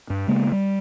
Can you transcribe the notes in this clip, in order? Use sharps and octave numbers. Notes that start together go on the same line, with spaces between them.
G2
C#3 G#3 A#3 B3
G3